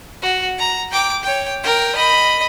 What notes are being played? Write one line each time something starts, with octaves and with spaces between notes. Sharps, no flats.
F#4
A#5
G5 D6
C#5 G5
A#4 G5
D#5 B5